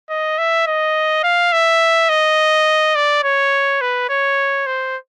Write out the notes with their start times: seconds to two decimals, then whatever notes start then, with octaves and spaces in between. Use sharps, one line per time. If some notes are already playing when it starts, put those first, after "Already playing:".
0.10 D#5
0.38 E5
0.67 D#5
1.23 F5
1.53 E5
2.09 D#5
2.96 D5
3.24 C#5
3.81 B4
4.09 C#5
4.67 C5